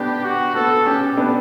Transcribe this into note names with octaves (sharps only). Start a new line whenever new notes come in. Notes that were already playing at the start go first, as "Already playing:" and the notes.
Already playing: B3 D4 G4
F#4
B3 A4
C#4 G4
B3 D4